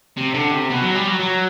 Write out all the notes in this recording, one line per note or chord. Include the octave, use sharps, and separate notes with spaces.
C3
D3
C3
B2
F#3
G3
F#3
F#3